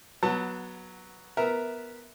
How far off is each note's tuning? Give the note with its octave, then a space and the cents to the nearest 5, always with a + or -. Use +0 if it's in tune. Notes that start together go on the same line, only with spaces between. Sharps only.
F#3 +0 B3 -15 A5 +30
B3 +0 A#4 +0 E5 -10